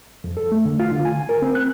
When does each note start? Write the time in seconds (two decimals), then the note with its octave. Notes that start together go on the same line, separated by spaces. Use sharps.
0.24 F2
0.37 A4
0.52 A3
0.65 D3
0.80 F4
0.91 D3
1.05 G#5
1.29 A#4
1.42 C4
1.55 F#6